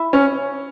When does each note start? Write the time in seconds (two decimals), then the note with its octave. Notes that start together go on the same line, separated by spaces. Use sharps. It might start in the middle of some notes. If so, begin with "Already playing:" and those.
Already playing: E4
0.13 C#4